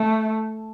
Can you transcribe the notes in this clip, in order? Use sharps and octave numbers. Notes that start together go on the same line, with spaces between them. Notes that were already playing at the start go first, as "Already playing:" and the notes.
Already playing: A3